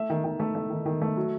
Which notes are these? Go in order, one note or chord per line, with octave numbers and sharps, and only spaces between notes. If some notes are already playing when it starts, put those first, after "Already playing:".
Already playing: A3 E5
D#3
D#3
A3
A3
D#3
D#3
A3
F#3